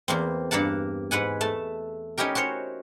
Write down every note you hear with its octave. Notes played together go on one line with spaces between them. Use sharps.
E2 A#3 C4
G2 A#3 A#4 F#5 A5
G#2 B4 F#5 G#5
A3 A5
C#4 D#4 E4 G4 A#4
F#4 A#4 C5 C#5